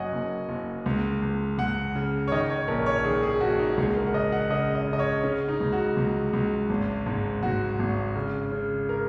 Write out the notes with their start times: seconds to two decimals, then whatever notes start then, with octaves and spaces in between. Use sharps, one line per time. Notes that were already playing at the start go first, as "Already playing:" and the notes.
Already playing: F#1 F#2 C#5 D#5 F#5 G#5
0.12 F#1
0.49 F#1
0.86 C#2
1.22 C#2
1.58 C#2 F#5
1.95 C#3
2.28 C#5
2.32 D#3 D#5
2.50 C#5
2.68 A#1 A#4
2.86 C#5
3.04 D#3 G#4
3.23 G#4
3.41 A#1 F#4
3.59 D#4
3.77 C#2 G#4
3.96 A#4
4.06 F#5
4.14 C#3 D#5
4.32 F#5
4.50 C#3 D#5
4.75 D#5
4.87 C#3
4.93 D#5
4.99 C#5
5.23 C#3 C#4
5.48 D#4
5.60 C#2
5.72 F#4
5.97 C#2
6.33 C#2
6.70 G#1
7.06 G#2
7.43 G#2 F#4
7.79 G#1
8.16 C#3
8.52 C#3
8.89 A#4